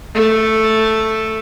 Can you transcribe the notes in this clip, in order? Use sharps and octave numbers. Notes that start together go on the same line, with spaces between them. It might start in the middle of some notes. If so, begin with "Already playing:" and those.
A3 A4